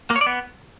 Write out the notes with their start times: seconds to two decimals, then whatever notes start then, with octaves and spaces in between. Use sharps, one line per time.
0.10 A#3
0.16 C#5
0.21 D5
0.26 B3